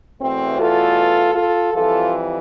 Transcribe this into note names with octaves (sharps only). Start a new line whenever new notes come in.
E2 B2 A3 C4
F4 A4
F4 A4
F2 E3 G3 F4 A4